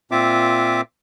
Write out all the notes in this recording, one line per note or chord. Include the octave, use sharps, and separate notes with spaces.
A#2 C4 F4 E5 D6